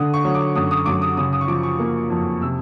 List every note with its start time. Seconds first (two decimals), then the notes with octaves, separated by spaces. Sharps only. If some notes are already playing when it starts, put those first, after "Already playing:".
Already playing: D3 D#6
0.14 C#6
0.24 F#3
0.35 D6
0.56 F#2 D#6
0.71 D#6
0.86 F#2 D6
1.02 D#6
1.17 C#3 D#6
1.33 D#6
1.41 C#6
1.48 F3 D6
1.63 C#6
1.79 A#3
2.10 F2
2.41 C3 E6